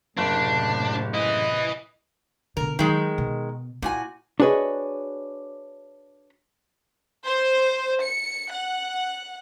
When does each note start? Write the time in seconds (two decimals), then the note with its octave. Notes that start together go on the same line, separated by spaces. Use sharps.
0.17 F#1 A2 C3 D4
1.14 E4 B4 D#5
2.57 B2 D3 A#4
2.79 D#3 F#3 G#3
3.18 B2
3.82 A#2 E4 F#4 G#5
4.40 D4 F#4 G#4 B4 C#5 D#5
7.25 C5
8.03 C#7
8.52 F#5